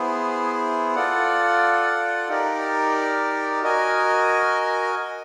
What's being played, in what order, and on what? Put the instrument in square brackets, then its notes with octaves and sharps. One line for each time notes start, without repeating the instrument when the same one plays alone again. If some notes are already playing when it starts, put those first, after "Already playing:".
Already playing: [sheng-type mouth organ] B3 E4 G#4 C5
F4 A4 D5 F#5
D#4 G4 A#4 D5
F#4 A#4 D#5 G#5